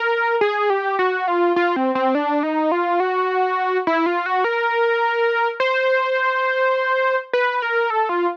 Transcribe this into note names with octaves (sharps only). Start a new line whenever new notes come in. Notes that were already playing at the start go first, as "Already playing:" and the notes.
Already playing: A#4
G#4
G4
F#4
F4
F4
C4
C4
D4
D#4
F4
F#4
E4
F4
F#4
A#4
C5
B4
A#4
A4
F4